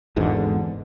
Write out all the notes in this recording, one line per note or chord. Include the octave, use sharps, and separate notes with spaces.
G#1 E2 G#2 D3